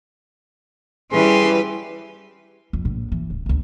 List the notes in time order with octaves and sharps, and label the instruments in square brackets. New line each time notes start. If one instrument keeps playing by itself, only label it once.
[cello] E3 C#4 [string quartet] G3 G4 B4 [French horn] G#4 [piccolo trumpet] C6
[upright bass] F2
A#1 A2
E3
D1
D2 A#2